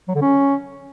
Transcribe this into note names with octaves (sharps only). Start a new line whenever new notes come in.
F#3
D3
C#4